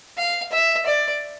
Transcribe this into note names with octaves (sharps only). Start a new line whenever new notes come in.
F5
E5
D5